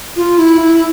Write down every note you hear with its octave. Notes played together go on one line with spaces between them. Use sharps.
F4
E4
E4